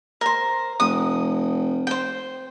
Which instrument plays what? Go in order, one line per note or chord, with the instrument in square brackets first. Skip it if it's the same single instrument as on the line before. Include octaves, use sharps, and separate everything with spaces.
[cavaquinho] A#4 C5
[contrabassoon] F1 [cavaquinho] D#6
[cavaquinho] C5 G5